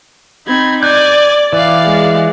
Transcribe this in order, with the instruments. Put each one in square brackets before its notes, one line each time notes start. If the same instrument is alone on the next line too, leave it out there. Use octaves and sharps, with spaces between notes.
[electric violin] C4 G#6 [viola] D#4 B5
[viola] D5 [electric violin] G#5 [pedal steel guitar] G6
[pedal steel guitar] E3 [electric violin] D5 F5
[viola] G#3